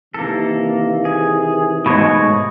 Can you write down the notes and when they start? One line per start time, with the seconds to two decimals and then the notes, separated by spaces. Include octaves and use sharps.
0.14 C3 D#3 E3 A#3 A4
1.05 G#4
1.86 G#2 B2 A3 C#5 D#5